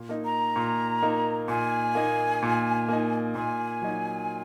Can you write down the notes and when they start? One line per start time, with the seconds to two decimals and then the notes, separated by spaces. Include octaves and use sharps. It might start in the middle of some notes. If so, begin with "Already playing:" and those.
Already playing: A#2
0.09 A#3 D#4
0.25 A#5
0.56 A#2
1.02 A#3 D#4
1.48 A#2 G#5
1.95 A#3 D#4
2.43 A#2
2.88 A#3 D#4
3.35 A#2 G#5
3.82 F#3 D#4